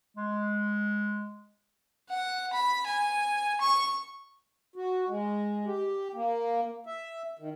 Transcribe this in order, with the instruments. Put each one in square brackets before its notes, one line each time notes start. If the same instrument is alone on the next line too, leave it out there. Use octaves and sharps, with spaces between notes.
[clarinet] G#3
[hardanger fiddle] F#5
B5
G#5
C#6
[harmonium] F#4
G#3
G4
A#3
E5
D#3